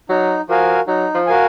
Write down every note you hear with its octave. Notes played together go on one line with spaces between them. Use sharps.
F#3 D#4
F3 F#4 A#4 F5 G#5
F#3 D#4
F3
F#4 A#4 F5 G#5